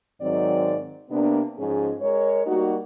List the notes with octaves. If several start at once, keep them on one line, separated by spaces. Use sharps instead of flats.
G#2 D#3 F#3 C4 D5
C3 A#3 B3 D4
G#2 F3 C#4 G#4
G#3 A#4 C#5
G3 A#3 D#4 F#4